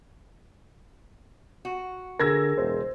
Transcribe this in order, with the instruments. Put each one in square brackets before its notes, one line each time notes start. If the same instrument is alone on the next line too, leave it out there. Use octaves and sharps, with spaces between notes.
[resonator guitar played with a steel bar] F#4
[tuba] D3 [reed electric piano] G#4 A#4 [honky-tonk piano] E6 G#6 A#6
[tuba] E1 [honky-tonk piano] C5